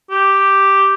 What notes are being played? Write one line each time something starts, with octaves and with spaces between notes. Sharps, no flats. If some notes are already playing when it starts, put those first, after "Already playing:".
G4